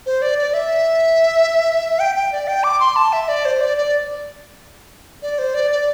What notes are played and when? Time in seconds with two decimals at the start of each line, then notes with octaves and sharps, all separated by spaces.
0.06 C5
0.22 D5
0.39 D5
0.54 E5
1.99 G5
2.15 G5
2.32 D5
2.48 G5
2.64 D6
2.80 C6
2.96 A5
3.13 E5
3.28 D5
3.45 C5
3.61 D5
3.78 D5
5.22 D5
5.39 C5
5.54 D5
5.71 D5